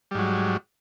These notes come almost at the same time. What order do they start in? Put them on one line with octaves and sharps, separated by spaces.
G3 G#2 F#3